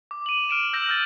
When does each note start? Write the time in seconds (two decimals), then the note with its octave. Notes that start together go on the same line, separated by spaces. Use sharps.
0.11 D6
0.26 D#7 F#7
0.49 F6 D7 E7
0.73 E6 G6 A#6 D7 E7 F#7
0.88 E6 F6 G6 A6 F#7